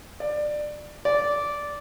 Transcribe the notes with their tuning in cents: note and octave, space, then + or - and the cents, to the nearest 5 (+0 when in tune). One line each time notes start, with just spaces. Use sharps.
D5 +20
D5 -10